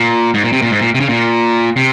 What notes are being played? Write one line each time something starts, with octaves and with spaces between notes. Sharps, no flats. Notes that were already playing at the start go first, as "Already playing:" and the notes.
Already playing: A#2
G#2
A#2
C3
A#2
G#2
A#2
C3
C#3
A#2
C3